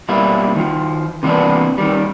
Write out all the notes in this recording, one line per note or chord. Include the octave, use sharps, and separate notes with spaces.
B2 G3 A#3 E4
D#3 F3
C3 E3 A#3 B3 D4
D#3 G3